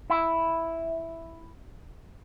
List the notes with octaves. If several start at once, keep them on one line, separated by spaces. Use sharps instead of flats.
E4